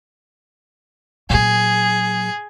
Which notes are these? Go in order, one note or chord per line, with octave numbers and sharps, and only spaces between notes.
A#2 F#3 G#4